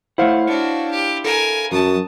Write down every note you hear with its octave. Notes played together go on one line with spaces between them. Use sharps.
A3 E4 C5 C#5 F5 F#5
D4 F#4 C#5
G4
A4 A#4 G#5
F#2 F#3 A5 D#6